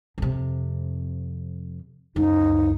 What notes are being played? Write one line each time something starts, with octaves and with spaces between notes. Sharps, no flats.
F2 C3
C#2 F#2 D#4